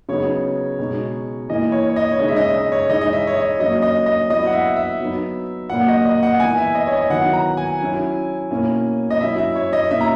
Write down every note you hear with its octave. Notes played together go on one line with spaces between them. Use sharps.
C#3 F#3 B3 D#4 C#5
B2 G#3 D#4
E3 A#3 E4 D#5
C#5
C#5
D#5
C#5
C#3 G#3 D#4 D#5
E5
D#5
D#5
C#5
E3 G#3 D#4 D#5
D#5
E5
C#5
D#5
F#3 A#3 C#4 D#5
D#5
D#5
F#3 B3 E4 D#5
F#5
E5
E5
F#3 B3 D#4
A#2 F#3 A#3 F#5
D#5
D#5
F#5
E3 B3 E4 G#5
E5
D#5
C#5
D#5
D#3 F#3 B3 E4 F#5
A#5
G#5
F#3 C#4 E4
B2 A#3 C#4 E4
D#5
F#3 C#4 E4 E5
E5
C#5
D#5
B2 A#3 C#4 E4 E5
A#5